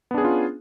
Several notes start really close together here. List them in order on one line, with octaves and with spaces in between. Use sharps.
B3 D4 G#4 C#4 F4